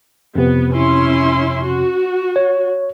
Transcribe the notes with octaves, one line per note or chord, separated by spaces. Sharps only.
F2 C3 B3
C#4 E4 C6
F#4
C#5